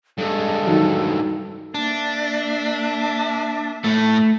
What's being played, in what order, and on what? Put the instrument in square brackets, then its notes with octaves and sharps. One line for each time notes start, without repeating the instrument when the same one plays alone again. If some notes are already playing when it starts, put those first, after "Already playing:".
[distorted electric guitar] G2 G#3 [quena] A4
[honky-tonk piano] D#3 F#3
[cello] A#3 E5 [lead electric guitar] D4
[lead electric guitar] A2 A4 [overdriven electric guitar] A3